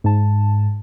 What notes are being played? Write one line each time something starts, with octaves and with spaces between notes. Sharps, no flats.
G#2 A5